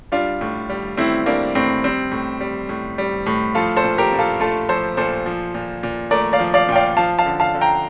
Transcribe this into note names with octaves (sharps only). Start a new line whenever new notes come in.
G3 D4 F4
A2
G3
A2 C4 E4
G3 A#3 D4
A2 C4
G3 C4
A2
G3
A2
G3
A2
F3 F4 A4
A4 C5
A#2
G4 A#4
A#2
F4 A4
A3 F4 A4
F3 A4 C5
A#2 A4 C5
F3
A#2
A#2
A3 A#4 D5
D5 F5
F3
D5 F5
A#2 G5
D5 F5
F3 F5 A5
F5 A5
D3
F5 A5
D3
G5 A#5